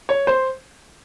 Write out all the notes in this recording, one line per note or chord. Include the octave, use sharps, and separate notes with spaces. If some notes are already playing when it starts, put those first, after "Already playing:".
C#5
C5